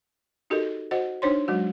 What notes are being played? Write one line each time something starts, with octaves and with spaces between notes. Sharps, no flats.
D#4 F#4 G4 A4 A#4 D#5
F#4 C5 D#5 F#5
D4 D#4 C5 C#5 C6
F#3 G#3 F#4